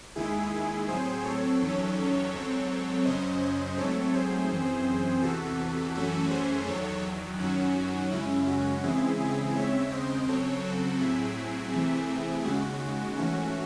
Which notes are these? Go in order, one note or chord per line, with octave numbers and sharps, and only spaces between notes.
D#2 D#3 G#3 E4 G#4
A2 F#3 C4 G#4 C5
A4 C#5
E2 D#3 F#3 C#4
G#2 F#3 C4 A4 C#5
F#2 C#3 F#3 C#4 C5 D#5
G#2 F#3 A3 C4 A4 C#5
G#4 C5
F#2 E3 C4
E2 C3 E3 F#4 A4
F#2 E3 A3 C#4 F#4 A4
G#4 C5
E2 D#3 F#3 A4 C#5
F#2 D#3 F#3 C#4 F#4
F#2 C#3 G#3 C#4 E4
F#4
C#3 E3 G#3 C4 E4 G#4
E4 G#4
D#2 C#3 G#3 C4 C#5 E5
C5 D#5
C#3 F#3 C4 A4 C#5
F#4 A4
A2 F#3 C4 E4 G#4
C3 E3 A3 C4
D#2 C#3 G#3 F#4
G#2 E3 A3 C#4